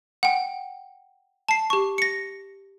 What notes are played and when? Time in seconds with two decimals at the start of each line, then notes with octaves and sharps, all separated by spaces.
0.23 F#5 G5
1.49 A5 C7
1.70 G4 C#6
1.98 A#6 C#7